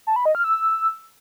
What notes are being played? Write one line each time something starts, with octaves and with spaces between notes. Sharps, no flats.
A5
B5
D#5
F6
E6